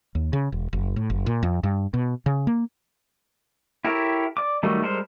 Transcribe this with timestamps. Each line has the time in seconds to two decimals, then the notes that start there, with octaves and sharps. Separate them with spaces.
0.15 D#2
0.33 C#3
0.52 E1
0.73 F#1
0.96 A2
1.10 F#1
1.26 A#2
1.43 F2
1.63 G2
1.94 B2
2.26 C#3
2.47 A#3
3.85 E4 G4 A4 A#4 C#5
4.37 D5 D6
4.63 D#3 F#3 G3 A3 D#4
4.82 G3 G#3 A4 A#4 C5